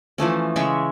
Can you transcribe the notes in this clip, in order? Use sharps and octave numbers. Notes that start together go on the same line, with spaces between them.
E3 F3 A3 C#4
C#3 G#3 E5 C#6